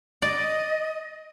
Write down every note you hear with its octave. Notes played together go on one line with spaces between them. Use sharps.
D5 D#5